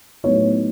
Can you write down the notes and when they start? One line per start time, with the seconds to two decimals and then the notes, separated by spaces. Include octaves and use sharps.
0.24 A2 F#3 B3 D#4 C#5